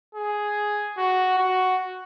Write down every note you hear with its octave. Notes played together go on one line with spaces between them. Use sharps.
G#4
F#4
F#4